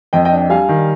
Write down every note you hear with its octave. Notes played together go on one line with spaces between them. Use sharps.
F2 D#5 G5
D#5 G5
D4
D#5 G5
G3 F5 G#5
D#3